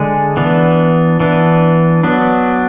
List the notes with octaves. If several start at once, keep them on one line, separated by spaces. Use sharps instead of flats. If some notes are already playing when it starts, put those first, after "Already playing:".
Already playing: D3 G#3 D4 G#4
E3 B3 D4
E3 B3 D4
F#3 B3 D4